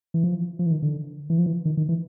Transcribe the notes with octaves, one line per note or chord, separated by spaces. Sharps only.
E3
F3
F3
E3
D#3
D3
E3
F3
E3
D#3
D#3
E3